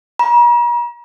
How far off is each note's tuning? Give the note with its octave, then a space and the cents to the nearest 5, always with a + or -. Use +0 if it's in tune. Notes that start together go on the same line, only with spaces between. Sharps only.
A#5 +45